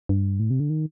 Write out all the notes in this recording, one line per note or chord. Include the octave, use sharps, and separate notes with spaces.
G2
A2
C3
D3
D#3